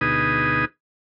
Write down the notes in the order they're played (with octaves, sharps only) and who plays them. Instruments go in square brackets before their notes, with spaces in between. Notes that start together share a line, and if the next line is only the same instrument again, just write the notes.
[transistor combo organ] D2 B2 D#4 G#4 B4 D#6